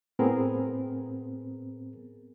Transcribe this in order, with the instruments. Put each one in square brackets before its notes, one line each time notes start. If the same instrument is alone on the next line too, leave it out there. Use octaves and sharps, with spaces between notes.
[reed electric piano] A2 B3 C4 G#4 A#4